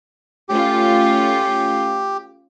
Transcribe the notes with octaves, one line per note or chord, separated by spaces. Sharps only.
A3 C#4 F4 G4